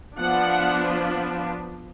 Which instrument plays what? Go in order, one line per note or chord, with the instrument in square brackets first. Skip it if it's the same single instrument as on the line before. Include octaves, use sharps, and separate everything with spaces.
[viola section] F3 B3 D4 F#5